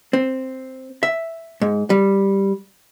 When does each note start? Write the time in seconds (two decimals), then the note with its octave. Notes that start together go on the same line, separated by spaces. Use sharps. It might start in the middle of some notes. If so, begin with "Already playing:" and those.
0.13 C4
1.03 E5
1.62 G#2
1.90 G3